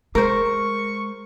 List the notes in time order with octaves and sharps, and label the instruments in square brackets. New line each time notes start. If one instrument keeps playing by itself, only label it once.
[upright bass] G#3 [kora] A#4 C5 [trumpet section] C#6